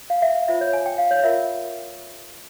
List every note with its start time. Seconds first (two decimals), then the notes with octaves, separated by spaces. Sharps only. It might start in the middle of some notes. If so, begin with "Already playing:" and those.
0.10 F5
0.22 E5
0.35 F5
0.48 F4 C5 E5
0.61 C#5
0.73 G#5
0.86 G5
0.98 F5
1.11 C#5
1.24 F4 A#4 C#5 E5